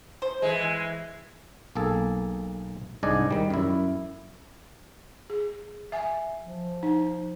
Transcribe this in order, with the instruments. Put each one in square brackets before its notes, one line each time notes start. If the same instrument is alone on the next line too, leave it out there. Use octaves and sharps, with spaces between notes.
[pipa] C5
[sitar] E3 G#3
[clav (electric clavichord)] B1 A#3 G#4 A4
C2 G#2 D4 D5 D#5 G#5
D#3 G3
F#2 E4
[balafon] G#4
E5 G#5
[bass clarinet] F3
[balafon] D#4